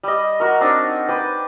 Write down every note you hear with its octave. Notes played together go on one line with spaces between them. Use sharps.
G3 D#5
F#4 A#4
C4 D4 D#4
B4 G5 D6